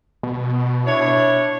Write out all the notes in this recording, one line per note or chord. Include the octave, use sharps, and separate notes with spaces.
B2
D4 E4 C#5